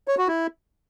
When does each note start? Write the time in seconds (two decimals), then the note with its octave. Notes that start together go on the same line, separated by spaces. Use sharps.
0.08 C#5
0.18 F#4
0.28 E4